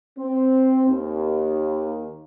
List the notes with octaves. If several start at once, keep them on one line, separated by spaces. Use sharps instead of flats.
C4
D#2